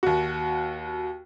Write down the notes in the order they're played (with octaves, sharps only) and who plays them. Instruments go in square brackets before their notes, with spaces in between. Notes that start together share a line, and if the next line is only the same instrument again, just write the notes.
[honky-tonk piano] D#2 F#4